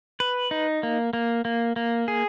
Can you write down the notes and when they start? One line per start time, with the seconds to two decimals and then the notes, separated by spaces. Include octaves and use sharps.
0.20 B4
0.51 D#4
0.83 A#3
1.13 A#3
1.45 A#3
1.76 A#3
2.08 G#4